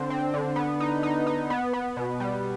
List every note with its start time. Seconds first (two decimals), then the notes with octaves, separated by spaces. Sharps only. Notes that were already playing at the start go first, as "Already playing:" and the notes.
Already playing: D3 C4
0.10 C4
0.34 D3
0.56 B3
0.80 D#4
1.03 D#4
1.27 D#4
1.50 B3
1.73 B3
1.97 B2
2.20 G3